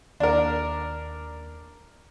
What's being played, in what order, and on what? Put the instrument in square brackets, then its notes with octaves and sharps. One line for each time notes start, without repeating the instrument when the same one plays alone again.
[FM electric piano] D#2 [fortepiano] D4 A#4